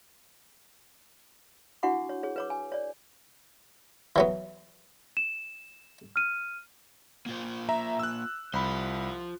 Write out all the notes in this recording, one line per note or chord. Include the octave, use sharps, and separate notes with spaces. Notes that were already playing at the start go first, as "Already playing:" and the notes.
D4 E4 F#4 F#5 C#6 D6
C#5
G#4 C#5
B4 C#5 D6
G#5
C#5 D5
E3 F#3 B3
E7
F6 D#7
A#3 F4 C5
E5 A#5
E6 F#6
C2 F4 C5 B5